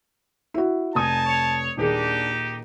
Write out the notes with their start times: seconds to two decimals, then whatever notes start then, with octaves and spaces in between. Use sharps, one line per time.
0.54 E4 F#4
0.95 F1 D#4 G#5 A5 D#6
1.24 C#5
1.77 D#1 D#2 D4 D#4 G4 G#4